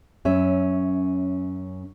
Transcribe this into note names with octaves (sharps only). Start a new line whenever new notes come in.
F#2 C#4 E5